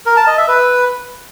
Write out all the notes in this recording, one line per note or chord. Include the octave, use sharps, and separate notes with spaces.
A#4
A5
D#5
E5
B4